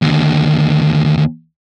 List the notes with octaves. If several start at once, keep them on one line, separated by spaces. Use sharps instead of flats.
D#2 D3